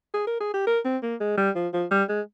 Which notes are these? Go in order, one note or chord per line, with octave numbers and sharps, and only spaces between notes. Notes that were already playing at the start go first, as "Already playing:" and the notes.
G#4
A#4
G#4
G4
A#4
C4
A#3
G#3
G3
F3
F3
G3
G#3